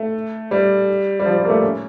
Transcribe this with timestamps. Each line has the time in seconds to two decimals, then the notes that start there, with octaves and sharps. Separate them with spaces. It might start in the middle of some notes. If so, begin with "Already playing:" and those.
Already playing: A3
0.51 G3
1.20 G3
1.26 F3
1.38 G3
1.45 A#3
1.49 A3
1.62 C#4